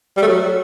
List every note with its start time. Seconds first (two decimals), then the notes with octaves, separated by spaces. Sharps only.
0.17 G3
0.22 A3
0.27 F#3